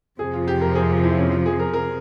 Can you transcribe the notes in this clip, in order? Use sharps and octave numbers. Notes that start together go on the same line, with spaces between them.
F2 C3 F3 G#4
F4
G4
A#4
G#4
F4
E4
C#4
F4
G#4
A#4
A#4